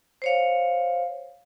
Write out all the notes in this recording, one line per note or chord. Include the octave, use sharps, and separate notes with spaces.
C5 C#5 F5